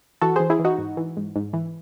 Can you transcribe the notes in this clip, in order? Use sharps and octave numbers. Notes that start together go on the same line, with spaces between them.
E3 F#4 A4
E3 G#4 C5
E4 G#4
E3
D#4 F#4
G#2
E3
G#2
G#2
E3